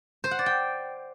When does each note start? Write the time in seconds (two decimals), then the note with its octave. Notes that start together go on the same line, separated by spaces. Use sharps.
0.24 C5
0.31 F#5
0.39 D5
0.46 G5